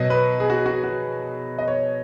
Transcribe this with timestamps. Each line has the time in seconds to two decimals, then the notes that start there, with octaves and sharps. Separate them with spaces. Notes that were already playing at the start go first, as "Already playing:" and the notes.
Already playing: B2 F#3 D#5
0.10 B4
0.40 G#4
0.50 F#4
0.66 F#4
0.83 F#4
1.58 D#5
1.68 C#5